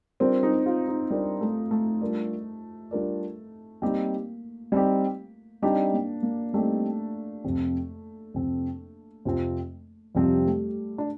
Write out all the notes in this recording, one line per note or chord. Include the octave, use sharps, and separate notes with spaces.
G3 C4 D4 F4 A#4 D5
D#4
F4
D#4
G3 C4 D4 F4 A#4 D5
A3
A3
G3 D4 F4 A#4 D5
G3 D4 F4 A#4 D5
G3 A#3 C4 D#4 G4
G3 C4 D#4 G4
G3 C4 D4 D#4 G4
A#3
A#3
G3 A3 C4 D#4 G4
F2 C3 F3 C4
F2 C3 F3 C4
F2 C3 F3 C4
F2 C3 F3 G3 C4
A3
D4